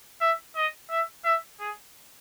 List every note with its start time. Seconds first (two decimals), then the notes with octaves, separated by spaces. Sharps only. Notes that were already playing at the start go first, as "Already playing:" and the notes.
0.21 E5
0.56 D#5
0.90 E5
1.25 E5
1.60 G#4